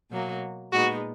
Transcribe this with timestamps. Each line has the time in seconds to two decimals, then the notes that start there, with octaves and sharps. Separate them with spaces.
0.10 B2 F#3 A#3
0.72 A#2 G#3 B3 D#4 F#4